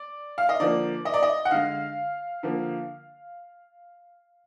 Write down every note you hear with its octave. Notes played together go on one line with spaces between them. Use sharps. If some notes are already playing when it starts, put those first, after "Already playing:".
Already playing: D5
F5
D#5
D3 F3 A#3 D5
D#5
D5
D#5
F#5
D3 G#3 F5
D3 F3 A#3